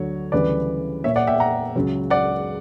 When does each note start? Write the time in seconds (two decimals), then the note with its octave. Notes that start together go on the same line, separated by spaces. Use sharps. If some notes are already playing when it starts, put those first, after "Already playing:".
Already playing: D2 D3 F#3 C#5
0.32 D2 C#3 E3 G3 B4 D5
1.04 A#2 A#3 C#5 E5
1.16 D5 F#5
1.27 E5 G5
1.40 F#5 A#5
1.76 C#2 C#3 F#3
2.10 D5 F#5